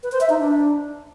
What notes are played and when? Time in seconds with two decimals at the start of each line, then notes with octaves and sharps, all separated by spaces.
0.03 B4
0.12 C5
0.21 E5
0.29 D#4
0.38 D4